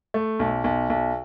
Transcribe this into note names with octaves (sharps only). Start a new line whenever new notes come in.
A3
B1
B1
B1